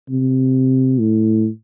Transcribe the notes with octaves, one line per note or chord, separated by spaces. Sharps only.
C3
A2